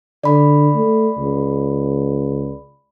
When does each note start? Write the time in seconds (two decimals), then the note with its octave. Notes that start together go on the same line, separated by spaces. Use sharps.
0.24 D3 D5 B5
0.75 A3
1.18 C#2